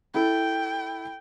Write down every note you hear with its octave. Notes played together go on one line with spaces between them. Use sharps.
E4 A4 G5